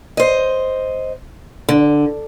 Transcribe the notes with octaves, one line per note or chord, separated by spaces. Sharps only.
C5 D#5
D3